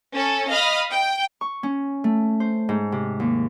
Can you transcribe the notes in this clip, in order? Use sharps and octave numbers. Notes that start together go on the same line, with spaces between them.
C#4 A4
D#5 F5 B5 D#6 F6
G5
C#6
C#4
A3
C5
G#2
C3
D#2